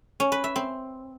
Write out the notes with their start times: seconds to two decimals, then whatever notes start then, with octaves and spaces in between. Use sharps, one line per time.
0.20 C#4
0.32 B4
0.44 E5
0.56 C4